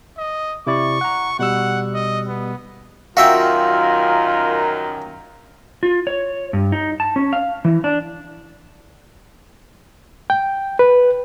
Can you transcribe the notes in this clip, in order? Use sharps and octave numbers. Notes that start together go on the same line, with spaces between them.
D#5
C3 E4 D5 C#6
F#5 A#5
B2 G3 F#5 E6
D#5
B3
F#2 D#3 F4 F#4 A#4 E5 F5 G5
F4
C#5
G2
D#4
A5
C#4
F5
E3
D4
G5
B4